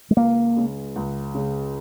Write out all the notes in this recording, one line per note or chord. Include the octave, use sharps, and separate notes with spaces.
G#3
C#2 A#3
C#3 G#3
C#2
C#3 G#3